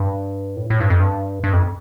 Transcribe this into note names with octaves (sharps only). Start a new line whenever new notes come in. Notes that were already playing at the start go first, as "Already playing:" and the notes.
Already playing: G2
A2
A2
G2
F2
G2
G2
F2